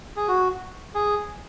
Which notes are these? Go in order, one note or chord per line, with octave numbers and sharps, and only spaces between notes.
G#4
F#4
G#4